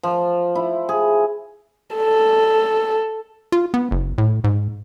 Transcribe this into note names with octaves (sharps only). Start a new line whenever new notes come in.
F3
E4
G#4
A4
F4
B3
F#1
A2
G#2